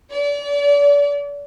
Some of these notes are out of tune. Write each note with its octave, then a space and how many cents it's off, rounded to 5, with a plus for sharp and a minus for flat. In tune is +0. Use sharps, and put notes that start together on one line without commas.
D5 -35